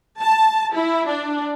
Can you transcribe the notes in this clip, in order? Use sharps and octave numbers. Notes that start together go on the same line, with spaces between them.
A5
E4
D4